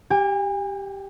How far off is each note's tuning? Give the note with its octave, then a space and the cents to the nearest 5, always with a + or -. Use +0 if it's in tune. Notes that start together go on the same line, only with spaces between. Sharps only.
G4 +0 G#5 -40